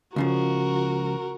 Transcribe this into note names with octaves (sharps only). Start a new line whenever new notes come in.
C#2 C#3 F3 F#4 A#4